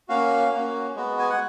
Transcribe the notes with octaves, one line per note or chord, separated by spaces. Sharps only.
A#3 C#4 F#4 F5
A#3 C#4 F#4
G#3 B3 F#4
G#5
F#5